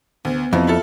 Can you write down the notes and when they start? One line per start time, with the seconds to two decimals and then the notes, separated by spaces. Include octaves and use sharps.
0.25 D2 B3
0.53 F2 C3 E3 F3
0.67 E4 F4 A4